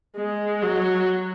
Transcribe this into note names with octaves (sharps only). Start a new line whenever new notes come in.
G#3
F#3